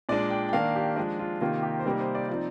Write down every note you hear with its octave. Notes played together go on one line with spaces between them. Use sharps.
A#2 G#3 D4 D5
G5
G5
D#3 A#3 D4 F5
G4
F3 G#3 D4
F4
C3 D#3 A#3 D#4 F4
G4
C5
C3 G3 A#3 D#4 A#4
C5
D5
F3 C4 D#4 D5